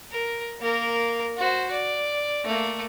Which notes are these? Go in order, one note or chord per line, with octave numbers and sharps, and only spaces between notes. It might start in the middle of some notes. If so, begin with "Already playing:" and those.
A#4
A#3 A#4
F#4 C5
D5
A3 A#3